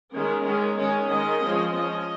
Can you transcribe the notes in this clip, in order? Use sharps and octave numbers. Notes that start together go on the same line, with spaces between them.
D#3 G#3 C#4 A#4
D#3 G#3 C#4
D#3 G#3 C#4 C#5
D#3 G#3 C#4 D#5
F3 G#3 C#4
F3 C#4 D#5